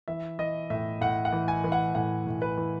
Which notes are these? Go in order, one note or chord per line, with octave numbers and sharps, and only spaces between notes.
E3 E5
E3 D#5
A2 E5
A2 F#5
F#5
E3
G#5
E3
F#5
A2 F#5
A2
B4
E3